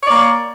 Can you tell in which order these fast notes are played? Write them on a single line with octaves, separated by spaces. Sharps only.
C#5 D5 A#3